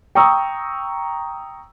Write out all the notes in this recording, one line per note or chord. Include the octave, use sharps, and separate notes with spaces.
G5 A#5 C#6 D#6 E6